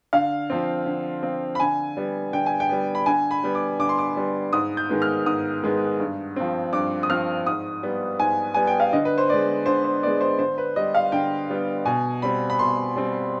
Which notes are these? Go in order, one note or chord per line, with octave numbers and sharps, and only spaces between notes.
D3 F5
F3 C4
D3
F3 C4
B5
D3 G#5
G3 B3
D3 G5
G#5
G5
G3 B3
B5
D3 G#5
B5
G3 B3
D6
D3 D6
C6
D6
G3 B3
G#2 D#6
G6
D#3 G#3 B3
F6
G#2 D#6
D#3 G#3 B3
G2
F3 C4
G2 D6
D#6
F3 C4 F6
G#2 D#6
G3 B3
G#2 G#5
G3 B3 G#5
G5
F5
D3 D#5
B4
C5
G#3 B3 D5
D3 C5
C5
G#3 B3 D5
C5
D3 C5
B4
G3 B3 D#5
F5
D3 G5
G3 B3
B2 G#5
G3 C4 B5
B5
B2 C6
G3 C4